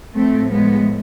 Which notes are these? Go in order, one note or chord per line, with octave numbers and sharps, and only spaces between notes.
A2 F3 A3 C4
G#3 B3